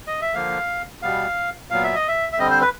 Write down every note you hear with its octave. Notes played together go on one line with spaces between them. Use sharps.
D#5
E5
D3 F3 A#3 F5
B2 G3 B3 F5
A#2 F#3 B3 F5
E5
D#5
E5
E5
D3 G3 C4 D#5
C5
B4